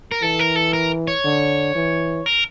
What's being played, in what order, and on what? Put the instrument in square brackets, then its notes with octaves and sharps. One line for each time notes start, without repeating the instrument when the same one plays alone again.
[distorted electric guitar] A#4
[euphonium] E3 [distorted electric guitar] A4
[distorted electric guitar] A#4
A4
A#4
C#5
[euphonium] D3
E3
[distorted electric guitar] A#4